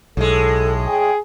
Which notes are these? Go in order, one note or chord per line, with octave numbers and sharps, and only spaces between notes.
B1 A2 G#3 A4
G#4 G5